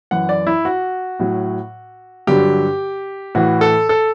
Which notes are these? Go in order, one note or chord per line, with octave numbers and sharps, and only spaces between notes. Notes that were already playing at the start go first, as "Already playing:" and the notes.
F#2 E3 F#5
D5
E4
F#4
A2 F#3
G2 D3 F#3 G4
A2 E3 F#4
A4
A4